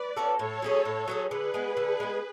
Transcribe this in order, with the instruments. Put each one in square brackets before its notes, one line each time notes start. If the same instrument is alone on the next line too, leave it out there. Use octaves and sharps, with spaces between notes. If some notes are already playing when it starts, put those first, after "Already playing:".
Already playing: [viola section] B4 D5
[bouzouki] C#4 F#4 A4
[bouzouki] A2 [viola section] A4 C#5
[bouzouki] F#3 C#4 G#4
A2
F#3 C#4 G#4
[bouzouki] D3 [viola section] G#4 B4
[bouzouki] G#3 B3
D3
G#3 B3